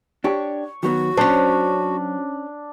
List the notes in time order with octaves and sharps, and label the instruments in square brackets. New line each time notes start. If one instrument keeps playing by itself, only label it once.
[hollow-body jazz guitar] D4 G4 [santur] C#5
[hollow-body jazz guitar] D#3 F#3 B3 [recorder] F#4
[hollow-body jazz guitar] F#3 [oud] C#4 C5 [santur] D4